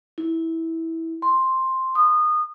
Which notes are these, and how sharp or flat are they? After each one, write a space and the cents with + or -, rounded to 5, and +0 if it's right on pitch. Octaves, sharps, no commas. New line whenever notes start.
E4 -15
C6 +5
D#6 -25